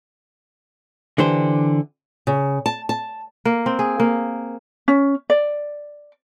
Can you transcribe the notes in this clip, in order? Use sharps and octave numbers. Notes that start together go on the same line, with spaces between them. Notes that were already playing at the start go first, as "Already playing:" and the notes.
D3 E3 D4 G4 C5
C#3
A5
A5
A#3
C4
G#4
A#3
C#4
D5